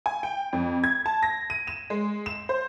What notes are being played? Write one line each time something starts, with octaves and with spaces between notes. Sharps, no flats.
G#5
G5
F2
G#6
A5
A#6
D#7
E7
G#3
E7
C5